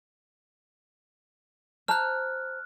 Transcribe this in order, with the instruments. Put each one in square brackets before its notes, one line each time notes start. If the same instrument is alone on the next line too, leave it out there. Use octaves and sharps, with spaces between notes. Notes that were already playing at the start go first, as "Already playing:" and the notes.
[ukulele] C5 A5 A#5 [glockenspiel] F6 F#6